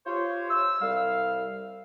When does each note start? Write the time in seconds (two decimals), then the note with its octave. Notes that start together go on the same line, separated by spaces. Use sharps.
0.06 F4 G4 C5 C#5
0.50 E6
0.82 C2 G3 F5